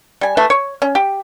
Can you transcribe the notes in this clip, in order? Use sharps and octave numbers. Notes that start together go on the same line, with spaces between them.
G3 G#5
E3 A3 B4 E5
C#5
C#4
G4